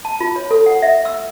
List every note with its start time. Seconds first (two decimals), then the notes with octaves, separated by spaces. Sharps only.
0.05 A5
0.20 F4
0.36 C#5
0.51 A4
0.66 F#5
0.82 E5
1.05 E6